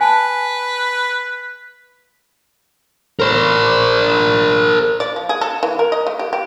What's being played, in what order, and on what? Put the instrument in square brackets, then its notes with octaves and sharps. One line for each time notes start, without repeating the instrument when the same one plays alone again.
[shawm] B4 [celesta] G#5 A5
[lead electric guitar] A#4 C5
[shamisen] D5
F3
G#4
A4
E3
A#4
D#5
A3
G4
G4